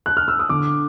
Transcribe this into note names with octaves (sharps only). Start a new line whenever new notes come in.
F#6
F6
E6
D#6
D3 D6